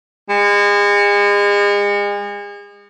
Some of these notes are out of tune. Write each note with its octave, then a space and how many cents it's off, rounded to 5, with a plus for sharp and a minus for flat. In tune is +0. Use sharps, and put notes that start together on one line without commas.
G#3 -35